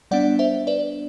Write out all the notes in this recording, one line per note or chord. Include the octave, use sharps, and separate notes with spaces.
G3 B3 D4 D5 F#5
C5 E5
B4 D5